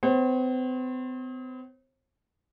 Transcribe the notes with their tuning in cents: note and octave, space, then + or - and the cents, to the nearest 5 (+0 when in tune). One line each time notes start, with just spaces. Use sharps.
C4 -45 C5 +45